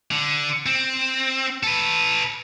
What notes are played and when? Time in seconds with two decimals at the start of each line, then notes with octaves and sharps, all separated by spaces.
0.11 D3
0.66 C4
1.63 A4 B4